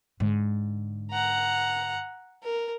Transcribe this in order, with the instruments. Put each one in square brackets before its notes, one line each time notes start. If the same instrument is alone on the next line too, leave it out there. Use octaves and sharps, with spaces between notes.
[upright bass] G#2 D3
[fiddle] F#5 A#5
A#4